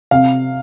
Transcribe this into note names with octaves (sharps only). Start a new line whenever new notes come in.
C3 F5